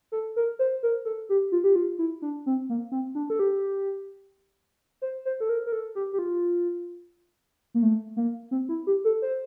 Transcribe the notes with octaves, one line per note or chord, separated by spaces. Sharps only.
A4
A#4
C5
A#4
A4
G4
F4
G4
F4
E4
D4
C4
A#3
C4
D4
A4
G4
C5
C5
A4
A#4
A#4
A4
G4
G4
F4
A#3
A3
A#3
C4
E4
G4
A4
C5